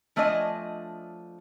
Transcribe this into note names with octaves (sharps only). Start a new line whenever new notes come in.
F3 A3 D4 C#5 D#5 G#5